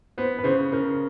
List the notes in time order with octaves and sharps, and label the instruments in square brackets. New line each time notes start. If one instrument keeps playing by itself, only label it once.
[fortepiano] B3 [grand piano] C5
[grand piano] B4
[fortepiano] C#3 [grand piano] C5
[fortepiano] C#3 [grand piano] A#4